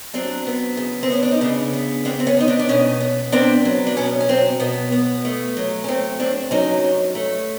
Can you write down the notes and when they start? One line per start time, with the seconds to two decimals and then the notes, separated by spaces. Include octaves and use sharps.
0.14 F#3 C4 D4
0.47 B3
0.77 C#3
1.03 C4
1.10 B3 C#4
1.23 D4
1.32 D#4
1.41 C#3 D4 E4
1.73 B3
2.05 B3 C4 D4
2.20 C4
2.27 B3 C#4
2.37 B3 D#4
2.48 C4 D4
2.59 D4
2.69 B2 C#4 D#4
3.00 B3
3.32 B3 C4 D4
3.65 F#3
3.87 D4
3.97 B2 B3 C#4
4.21 C#4
4.29 F#3 C4
4.60 B2 B3
4.92 B3
5.25 A3
5.57 F#3
5.84 C#4
5.88 A3 C4
6.20 G2 C4 D4
6.51 F#3 C#4 D#4
6.84 G2
7.15 A3